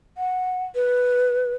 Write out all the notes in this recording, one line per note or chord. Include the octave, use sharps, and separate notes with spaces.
F#5
B4